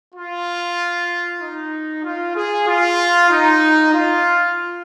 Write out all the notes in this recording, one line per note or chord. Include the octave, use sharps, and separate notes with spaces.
F4
D#4
F4
G#4
F4
D#4
F4